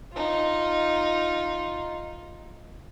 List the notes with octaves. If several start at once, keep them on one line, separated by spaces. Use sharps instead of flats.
D#4 F4